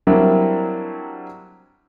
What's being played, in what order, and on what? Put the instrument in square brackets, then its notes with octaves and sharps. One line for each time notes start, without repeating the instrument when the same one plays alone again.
[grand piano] F#3 G3 A#3 C4 D4 E4